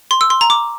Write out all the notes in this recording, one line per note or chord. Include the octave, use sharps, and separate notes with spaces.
C6
E6
C6
A#5
D6